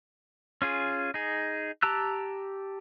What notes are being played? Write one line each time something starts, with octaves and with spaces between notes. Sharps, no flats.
C#4 F4 G#4
D#4 G#4
G4 A5 A#5 E6 F#6